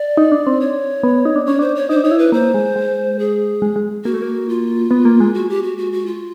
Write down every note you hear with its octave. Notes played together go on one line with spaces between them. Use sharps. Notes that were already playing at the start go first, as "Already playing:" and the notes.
Already playing: D5
D#4
D4
C4
C#5
B3
D#4
D4
C#4 C#5
D4 C5
C#5
D#4 C5
D4
D#4 C#5
E4
B4
A#3 C5
G#3
G#3
G#4
G#3
G#3
A#3 F#4
A3
A#3
F4
B3
A#3
G#3
F#4
G4
F#4
F#4
F#4
F4